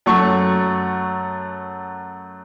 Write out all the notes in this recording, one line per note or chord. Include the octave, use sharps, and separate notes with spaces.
F#2 A3 C#6